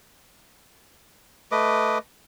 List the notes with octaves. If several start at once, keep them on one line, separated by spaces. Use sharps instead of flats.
A3 B4 D#5 D6